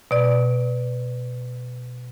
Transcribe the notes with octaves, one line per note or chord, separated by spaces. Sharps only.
B2 D5